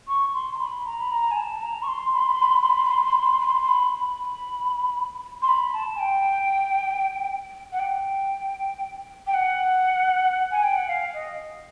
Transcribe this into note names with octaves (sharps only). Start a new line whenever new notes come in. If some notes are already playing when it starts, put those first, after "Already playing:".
C#6
C6
A#5
B5
A#5
B5
A#5
G#5
A5
A5
A#5
C#6
C6
B5
C6
B5
C6
B5
C6
B5
C6
B5
C6
B5
C6
B5
C6
B5
C6
B5
C6
B5
C6
B5
C6
B5
B5
C6
B5
A5
G#5
G5
F#5
G5
G5
F#5
G#5
G5
F#5
F5
D#5